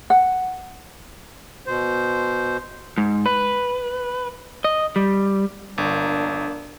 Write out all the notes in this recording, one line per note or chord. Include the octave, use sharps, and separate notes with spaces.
F#5
B2 C5
G#2
B4
D#5
G3
G1 A#3 D4